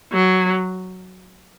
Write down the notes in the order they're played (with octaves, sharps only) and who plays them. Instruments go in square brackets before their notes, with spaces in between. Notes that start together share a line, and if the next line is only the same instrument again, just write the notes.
[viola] F#3